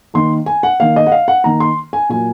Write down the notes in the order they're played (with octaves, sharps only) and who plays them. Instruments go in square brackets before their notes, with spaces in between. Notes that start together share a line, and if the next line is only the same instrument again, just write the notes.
[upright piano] D#3 A#3 C6
G#5
F#5
D#3 A#3 F5
D#5
F#5
F5
F#5
D#3 A#3 A#5
C6
G#5
A#2 F#3 A#3 G#5